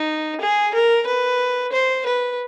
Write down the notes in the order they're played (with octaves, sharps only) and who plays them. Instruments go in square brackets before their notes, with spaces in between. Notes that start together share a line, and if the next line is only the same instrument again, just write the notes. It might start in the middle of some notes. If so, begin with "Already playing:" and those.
Already playing: [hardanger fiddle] D#4
G#4
A#4
B4
C5
B4